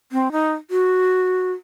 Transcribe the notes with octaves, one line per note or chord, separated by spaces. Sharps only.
C4
D#4
F#4